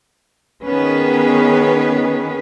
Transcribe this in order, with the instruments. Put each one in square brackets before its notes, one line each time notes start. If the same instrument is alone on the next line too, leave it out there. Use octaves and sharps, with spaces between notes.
[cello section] D#3 B3 C#4 G#4 B4